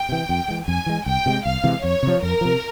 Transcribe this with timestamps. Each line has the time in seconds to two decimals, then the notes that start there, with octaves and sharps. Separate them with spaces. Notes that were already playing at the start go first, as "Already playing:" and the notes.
Already playing: G5
0.09 C3 E3
0.29 F2
0.48 E3 G#3
0.67 F2 G#5
0.86 E3 G#3
1.06 C2 G5
1.26 C3 E3 G#3
1.45 C2 F5
1.64 C3 E3 G#3
1.84 F2 C#5
2.03 C3 F3
2.22 F2 A#4
2.41 C3 F3